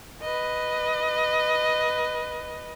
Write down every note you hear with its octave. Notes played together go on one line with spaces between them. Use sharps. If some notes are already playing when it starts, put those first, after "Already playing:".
B4 D#5